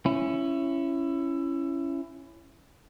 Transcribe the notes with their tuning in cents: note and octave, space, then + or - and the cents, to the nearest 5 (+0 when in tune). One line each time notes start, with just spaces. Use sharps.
C#4 +0 E4 +20